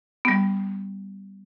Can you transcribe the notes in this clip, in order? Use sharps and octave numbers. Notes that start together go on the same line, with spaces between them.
G3 B3